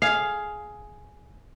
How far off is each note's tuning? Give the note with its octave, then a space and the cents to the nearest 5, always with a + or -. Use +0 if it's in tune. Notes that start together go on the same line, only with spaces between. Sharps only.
G#4 +10 F5 +0